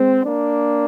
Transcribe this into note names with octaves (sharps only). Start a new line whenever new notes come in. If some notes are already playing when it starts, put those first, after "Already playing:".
Already playing: G#3 C4
A#3 D4